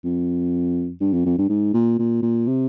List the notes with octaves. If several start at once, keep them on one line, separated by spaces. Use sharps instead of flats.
F2
G2
F2
F2
G2
G#2
A#2
A#2
A#2
C3